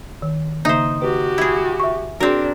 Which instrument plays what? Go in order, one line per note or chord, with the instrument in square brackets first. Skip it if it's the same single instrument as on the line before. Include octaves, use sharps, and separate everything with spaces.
[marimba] D#3
[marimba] C#3 A#3 E5 [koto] D#4 C5
[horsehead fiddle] F#4 G4 [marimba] B4
[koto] E4 G#4
[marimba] E5 C#6
[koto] C4 A#4 [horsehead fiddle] D4 [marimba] F#4 G#4